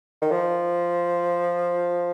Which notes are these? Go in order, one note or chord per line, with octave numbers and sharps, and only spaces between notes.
D#3
F3